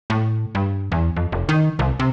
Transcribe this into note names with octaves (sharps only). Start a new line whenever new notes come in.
A2
G2
E2
F2
F1
D#3
C2
C3